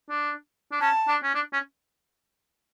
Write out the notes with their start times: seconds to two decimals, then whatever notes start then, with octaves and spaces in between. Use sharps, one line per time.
0.10 D4
0.72 D4
0.81 C#4 A5
1.08 D4
1.23 C#4
1.35 D4
1.53 C#4